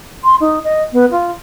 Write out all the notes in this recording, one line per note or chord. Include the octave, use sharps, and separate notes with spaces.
C6
D#4
D#5
B3
F4